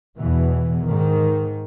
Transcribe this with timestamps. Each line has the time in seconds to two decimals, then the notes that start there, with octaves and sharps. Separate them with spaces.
0.18 E2 B2 E3
0.88 G#2 D#3